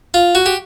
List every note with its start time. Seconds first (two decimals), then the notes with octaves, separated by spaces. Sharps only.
0.14 F4
0.35 F#4
0.46 G4